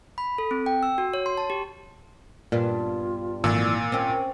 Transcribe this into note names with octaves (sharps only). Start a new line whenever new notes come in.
B5
A4
C4
G5
E6
F#4
C#5
C6
A5
G4
G2 A#2 B3 D4 F4
G#1 A#2 D3 E3 F#3 E6
C4 C#4 A#4